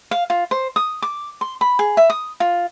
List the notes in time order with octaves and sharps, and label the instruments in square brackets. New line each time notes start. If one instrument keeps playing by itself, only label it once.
[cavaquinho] F5
F4
C5
D#6
D6
C6
B5
G#4
E5
D#6
F4